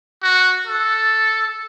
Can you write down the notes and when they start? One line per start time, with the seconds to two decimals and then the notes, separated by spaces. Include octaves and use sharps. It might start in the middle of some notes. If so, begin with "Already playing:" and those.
0.22 F#4
0.67 A4